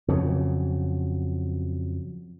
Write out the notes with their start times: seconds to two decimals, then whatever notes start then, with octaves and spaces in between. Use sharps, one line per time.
0.08 F2 C#3 F#3